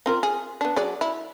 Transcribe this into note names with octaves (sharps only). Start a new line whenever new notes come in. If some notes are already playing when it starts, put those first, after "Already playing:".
C4 F4 A#4
G#4
B3 D4
F#3 G#4 D5
E4